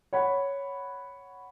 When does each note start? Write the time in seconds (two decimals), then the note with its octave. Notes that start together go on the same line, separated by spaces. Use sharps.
0.13 C#5 F#5 B5